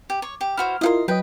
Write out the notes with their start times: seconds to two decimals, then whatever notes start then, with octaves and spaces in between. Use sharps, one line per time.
0.10 G4
0.22 C#5
0.41 G4
0.57 E4 F#4 C5 F6
0.81 E4 F4 A#4 D#5 F5 C6
1.08 F#3 B4 D#5 G5